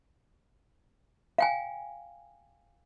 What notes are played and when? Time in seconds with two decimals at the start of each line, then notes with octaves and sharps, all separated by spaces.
1.38 F5 G5 G#5